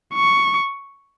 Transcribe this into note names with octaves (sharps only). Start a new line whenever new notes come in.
C#6